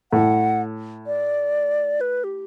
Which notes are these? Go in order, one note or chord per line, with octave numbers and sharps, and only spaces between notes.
A2 F#5
D5
B4
G4